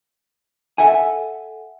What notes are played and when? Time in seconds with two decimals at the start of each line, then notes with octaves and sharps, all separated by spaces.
0.78 A4 E5 F#5 G#5